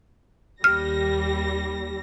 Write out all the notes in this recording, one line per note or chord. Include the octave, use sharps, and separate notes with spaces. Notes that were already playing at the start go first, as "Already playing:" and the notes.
D#2 G3 F6 A#6